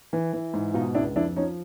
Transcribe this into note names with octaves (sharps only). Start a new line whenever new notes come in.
E3
E3
G#2
B2 D#4 F4
C#2 D4 E4
F2 D4 E4
F3 C#4 D#4